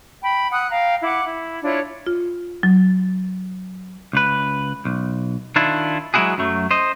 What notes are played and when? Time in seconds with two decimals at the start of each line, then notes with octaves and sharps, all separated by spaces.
0.23 G5 B5
0.51 F#5 D#6 E6 F#6
0.70 F5 G5 A#5
1.03 E4 F#5 D6
1.25 E4
1.63 D4 E4 F4 C#5
2.06 F4
2.63 F#3
4.13 C#2 B4
4.85 B1
5.56 D#3 D4 E4 F4
6.14 F#3 G#3 D#4 E4 F#4 G#4
6.38 F#2 F#3 A3
6.71 C5 D#5